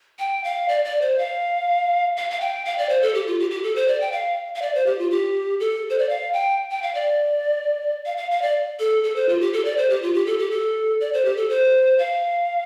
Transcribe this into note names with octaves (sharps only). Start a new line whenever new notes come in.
G5
F5
D5
D5
C5
F5
F5
F5
G5
F5
D5
C5
A4
G4
F4
G4
G4
A4
C5
D5
G5
F5
F5
D5
C5
G4
F4
G4
A4
C5
D5
F5
G5
G5
F5
D5
F5
F5
F5
D5
A4
A4
C5
F4
G4
A4
D5
C5
G4
F4
G4
A4
G4
A4
D5
C5
G4
A4
C5
F5